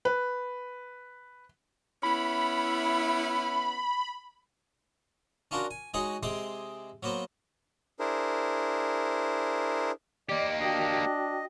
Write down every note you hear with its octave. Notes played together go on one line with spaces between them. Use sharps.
B4
B3 C#4 E4 B5
C#4 D4 F4 F#4 A#4
G#5
G#3 D#4 F#4 G#4 C#5 D#5
C3 G#3 G#4 C6 D6
F#3 A#3 B3 C5
D4 E4 G#4 A#4 C5
A#3 G4 D5 D#5
D4 F#4 D#5 G5